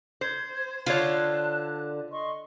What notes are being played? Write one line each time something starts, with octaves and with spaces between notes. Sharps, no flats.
C5 G#6
D3 F4 C5 C#5 A5 F#6
D#5 C6 C#6